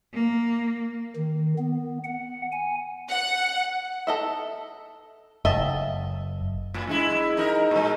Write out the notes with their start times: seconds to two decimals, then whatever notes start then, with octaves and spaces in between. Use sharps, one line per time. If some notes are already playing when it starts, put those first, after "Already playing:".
0.13 A#3
1.16 D#3
1.58 B3
2.04 F#5
2.52 G#5
3.09 F#5
4.07 A4 D#5 E5
5.45 F#1 D#5 E5 A5
6.74 A2
6.87 F#2 G#3 E4
7.37 D#4 A#4
7.71 A#2 G#3